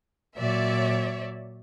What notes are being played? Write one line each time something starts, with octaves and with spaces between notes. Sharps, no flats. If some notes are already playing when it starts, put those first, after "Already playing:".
A#2 F#3 C#5 D5 E5